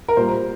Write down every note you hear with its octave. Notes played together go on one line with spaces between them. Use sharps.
A#4
A#2 G3 C5